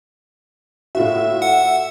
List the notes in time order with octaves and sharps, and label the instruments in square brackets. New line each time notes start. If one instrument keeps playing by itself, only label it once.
[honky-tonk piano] A2 F4 F#4 [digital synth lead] E5
[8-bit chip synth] F#5